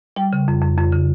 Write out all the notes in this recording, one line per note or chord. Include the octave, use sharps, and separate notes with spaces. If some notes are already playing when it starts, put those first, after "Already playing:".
G3 G5
C#3
F2
F2
F2
C#3